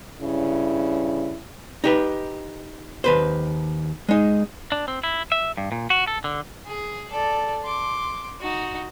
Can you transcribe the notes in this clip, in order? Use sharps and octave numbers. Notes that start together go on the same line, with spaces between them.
G2 C#3 C#4 E4
D#4 G4 B4
D#2 B4 C5
G#3 D#4
D4
C4
E4
E5
G2
A#2
F#4
A4
D3
G#4
A4 D5
C6 D6
D#4 F#4